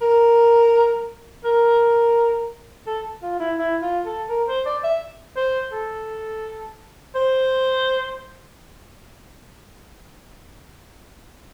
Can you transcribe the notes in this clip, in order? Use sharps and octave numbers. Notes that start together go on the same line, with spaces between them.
A#4
A#4
A4
F4
E4
E4
F4
A4
A#4
C5
D5
E5
C5
A4
C5